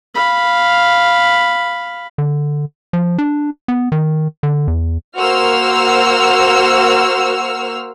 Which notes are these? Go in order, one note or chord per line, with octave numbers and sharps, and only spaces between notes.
F5 B5
D3
F3
D4
B3
D#3
D3
E2
A#3 F#4 C5 E6 F6